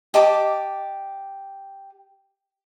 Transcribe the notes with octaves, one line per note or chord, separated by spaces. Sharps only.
G4 D#5 A5 D6